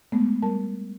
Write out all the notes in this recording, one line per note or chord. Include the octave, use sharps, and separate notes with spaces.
G#3 A3 B3
G3 A#4 A5